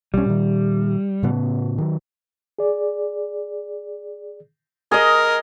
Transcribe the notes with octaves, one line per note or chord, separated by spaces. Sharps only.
B1 G3 C#4
A#2 D#3
A2 C#3 B3
D#3 F#3
G#4 D5
G#4 A#4 D#5